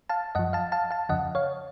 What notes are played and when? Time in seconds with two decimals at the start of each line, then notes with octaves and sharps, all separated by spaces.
0.09 F5 A5
0.35 F#2 F3 D#5 F#5
0.53 F5 A5
0.72 F5 A5
0.91 F5 A5
1.09 F2 C#3 F3 D#5 F#5
1.35 C#5 F5